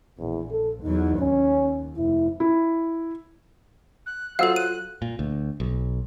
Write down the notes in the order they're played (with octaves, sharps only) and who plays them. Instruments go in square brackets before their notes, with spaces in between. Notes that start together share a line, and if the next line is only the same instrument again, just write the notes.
[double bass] A#1 [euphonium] E2
[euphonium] A4
[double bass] E2 F#3 [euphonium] D#4
[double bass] D#2 [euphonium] C#4
[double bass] F1 [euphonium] E4
[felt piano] E4
[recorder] F#6
[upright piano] F#3 F4 [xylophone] A4 F#5 [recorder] C5 [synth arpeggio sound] F5 E6
[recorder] F#6 [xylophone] D#7
[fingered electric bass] A#2
D2
B1